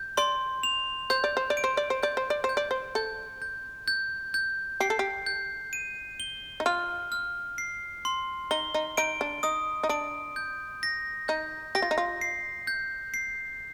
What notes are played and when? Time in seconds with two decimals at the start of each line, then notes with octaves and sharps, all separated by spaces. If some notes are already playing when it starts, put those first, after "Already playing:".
Already playing: G6
0.17 D5 C6
0.63 F7
1.10 C5 G6
1.24 D5
1.37 C5
1.50 D5
1.57 D7
1.64 C5
1.77 D5
1.90 C5
2.03 D5 G6
2.17 C5
2.30 D5
2.44 C5
2.49 G6
2.57 D5
2.71 C5
2.95 A4 G6
3.42 G6
3.88 G6
4.34 G6
4.80 G4 C7
4.90 A4
4.99 G4
5.26 G6
5.73 D#7
6.20 G7
6.60 D#4
6.66 F4 F6
7.12 F6
7.58 C7
8.05 C6
8.51 D#4 G7
8.74 D#4
8.97 D#4 D7
9.21 D4
9.43 D#4 D#6
9.83 D#4
9.89 D4 D7
10.36 G6
10.83 A#6
11.28 D#4 G6
11.75 G4 A#6
11.82 F4
11.91 D#4
11.98 F4
12.21 C7
12.67 G6
13.14 C7